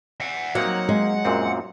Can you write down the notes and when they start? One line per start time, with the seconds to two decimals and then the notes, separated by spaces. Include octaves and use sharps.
0.20 E5 F#5
0.55 F#3 A#3 C4 D#4 F#5
0.89 G#3
1.25 F#2 A#2 C4